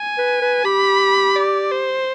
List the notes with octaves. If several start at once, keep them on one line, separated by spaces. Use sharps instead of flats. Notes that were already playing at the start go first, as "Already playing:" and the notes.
Already playing: G#5
B4
B4
G4 B5
D5
C5